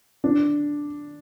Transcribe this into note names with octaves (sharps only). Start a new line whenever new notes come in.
D4